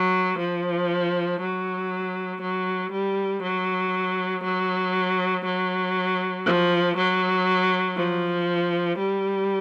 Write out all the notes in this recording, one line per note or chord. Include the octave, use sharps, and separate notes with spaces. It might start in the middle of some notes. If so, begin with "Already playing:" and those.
Already playing: F#3
F3
F#3
F#3
G3
F#3
F#3
F#3
F3
F#3
F3
G3